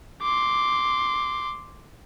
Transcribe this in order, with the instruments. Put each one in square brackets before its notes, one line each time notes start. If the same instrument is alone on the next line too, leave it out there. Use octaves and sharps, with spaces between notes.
[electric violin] C6 D6